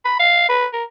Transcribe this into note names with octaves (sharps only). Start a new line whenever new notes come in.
B5
F5
B4
A#4